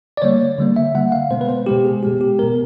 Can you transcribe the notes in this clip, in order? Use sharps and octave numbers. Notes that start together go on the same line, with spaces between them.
D5
D3 G3 A#3 C#5
D3 G3 A#3
E5
D3 G3 A#3 F#5
F5
B2 G#3 B3 C5
B4
C5
B2 G#3 B3 G4
G#4
B2 G#3 B3 G4
G4
B2 G#3 B3 A#4